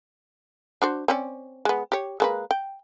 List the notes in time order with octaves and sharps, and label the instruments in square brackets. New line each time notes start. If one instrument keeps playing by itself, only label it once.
[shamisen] D4 F#4 C5
C4 C#4 D5
G#3 B3
G4 C#5
G#3 A#3 B4
G5